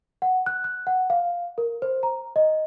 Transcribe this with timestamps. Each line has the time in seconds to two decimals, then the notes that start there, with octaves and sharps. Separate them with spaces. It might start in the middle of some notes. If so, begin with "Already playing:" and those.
0.22 F#5
0.46 F#6
0.64 F#6
0.87 F#5
1.10 F5
1.58 A#4
1.82 C5
2.03 A#5
2.36 D#5